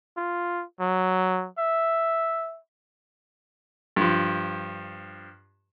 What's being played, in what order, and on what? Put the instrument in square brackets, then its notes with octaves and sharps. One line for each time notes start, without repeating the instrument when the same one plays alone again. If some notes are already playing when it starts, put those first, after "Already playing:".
[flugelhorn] F4
F#3
E5
[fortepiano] G2 F3